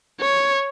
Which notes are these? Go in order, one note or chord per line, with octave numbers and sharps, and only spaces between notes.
C#5